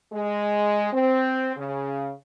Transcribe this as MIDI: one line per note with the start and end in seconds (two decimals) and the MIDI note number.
0.13 0.88 56
0.93 1.51 60
1.57 2.12 49